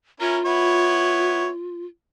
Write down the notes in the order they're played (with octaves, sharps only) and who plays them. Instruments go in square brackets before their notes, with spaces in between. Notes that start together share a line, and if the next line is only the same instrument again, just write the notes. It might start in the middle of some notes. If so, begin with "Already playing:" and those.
[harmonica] C#4 E4 A#4 [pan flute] F4
[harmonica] B3 E4 C#5